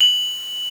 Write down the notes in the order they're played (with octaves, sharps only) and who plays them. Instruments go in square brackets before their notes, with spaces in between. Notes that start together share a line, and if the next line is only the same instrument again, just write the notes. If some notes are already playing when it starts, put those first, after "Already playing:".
[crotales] F#7